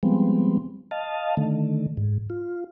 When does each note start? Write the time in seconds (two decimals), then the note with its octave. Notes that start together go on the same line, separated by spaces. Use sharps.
0.03 F3 G3 G#3 B3 C4
0.91 D#5 F5 A5
1.37 D3 D#3 A3
1.97 G#2
2.30 F4